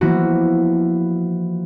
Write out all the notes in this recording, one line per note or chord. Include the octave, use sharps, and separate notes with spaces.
E3 F3 A#3 B3 E4 F#4